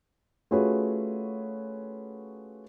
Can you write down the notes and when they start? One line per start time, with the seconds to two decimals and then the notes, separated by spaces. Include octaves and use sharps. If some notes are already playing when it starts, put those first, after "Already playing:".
0.51 A3 C#4 F4 F#4 G#4 B4